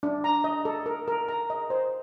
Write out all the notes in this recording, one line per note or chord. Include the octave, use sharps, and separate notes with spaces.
D4
A#5
D#5
A4
A#4
A#4
A#5
D#5
C5